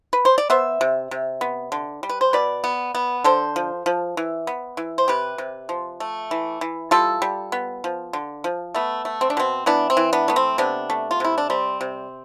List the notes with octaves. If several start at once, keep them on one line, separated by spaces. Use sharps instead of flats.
B4
C5
D5
B3 C5 E5
C3
C3
B3
D3
G3
B4
C5
B2 B4 D5
B3
B3
D3 A4 C5
F3
F3
E3
B3
E3
C5
C3 G4 B4
C3
F3
A3
E3
E3
G3 F4 A4
G3
B3
F3
D3
F3
A3 B3
A3
C4
D4
B2 C4
E3 B3 D4
C4
E3
B3 D4
A3 B3
C4
C3 B3 D4
A3
F4
C3 E4
D4
G3 C4
C3